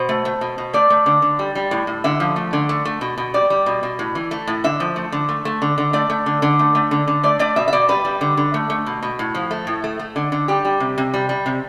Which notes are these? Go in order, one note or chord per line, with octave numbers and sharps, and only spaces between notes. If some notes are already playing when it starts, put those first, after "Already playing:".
Already playing: B2 C5
A3
A3
B2
B2
A3 D5
A3
D3
D3
G3
G3
A2
A2
D3 E5
F3
A3
D3
A3
A3
B2
B2
G3 D5
G3
B2
B2
A2
E3
A3
A2
D3 E5
F3
A3
D3
A3
A3
D3
D3
A3 D5
A3
D3
D3
A3
A3
D3
D3
A3 D5
A3 D5
B2 E5
E5
B2 D5
G3 B4
G3
D3
D3
A3
A3
B2
B2
A2
F3
A3
A2
A3
A3
D3
D3
G3 G4
G3
C3
C3
G3
G3
C3